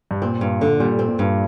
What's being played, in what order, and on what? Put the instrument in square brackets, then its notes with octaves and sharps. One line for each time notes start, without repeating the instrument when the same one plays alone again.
[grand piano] G2
[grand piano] A#2 [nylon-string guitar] C4
[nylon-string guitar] G2
D3
[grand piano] A#2 [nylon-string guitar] G3
[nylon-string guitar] C4
[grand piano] A#2
[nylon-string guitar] G2